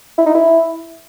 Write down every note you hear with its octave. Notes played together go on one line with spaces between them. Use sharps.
E4
D#4
E4